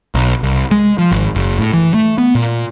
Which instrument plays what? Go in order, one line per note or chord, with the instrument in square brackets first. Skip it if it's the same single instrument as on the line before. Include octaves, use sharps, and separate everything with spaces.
[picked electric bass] B1
C2
G#3
F3
G#1
F#1
A2
E3
A3
B3
A#2